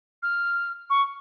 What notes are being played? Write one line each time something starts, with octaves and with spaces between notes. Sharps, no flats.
F6
C#6